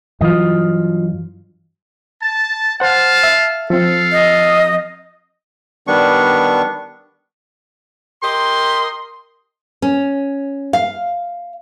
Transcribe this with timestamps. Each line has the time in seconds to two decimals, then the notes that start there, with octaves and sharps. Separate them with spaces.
0.21 G2 E3 F#3 F4 D#5
2.21 A5
2.80 C5 F5 F#5 A5
3.23 E5
3.70 F3 C4 A4 F5
4.12 D#5
5.87 D#3 G3 B3 D4 C#6
8.24 G4 A#4 D#5 C6
9.82 C#4
10.73 F5